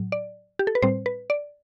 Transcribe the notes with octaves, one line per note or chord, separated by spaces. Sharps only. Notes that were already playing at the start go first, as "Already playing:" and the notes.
Already playing: A2 F#3
D5
G4
A4
B4
A2 G3 C4 C5
B4
D5